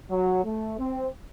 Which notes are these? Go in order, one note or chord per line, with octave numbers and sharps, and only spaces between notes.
F#3
A3
C4